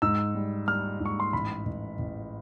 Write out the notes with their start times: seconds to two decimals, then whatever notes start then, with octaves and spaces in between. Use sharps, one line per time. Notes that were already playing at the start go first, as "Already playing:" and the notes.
0.02 G#2 E6
0.35 G3
0.68 G3 F6
1.00 G#2
1.05 C#6
1.20 C6
1.33 A1 B5
1.66 A1
1.99 A1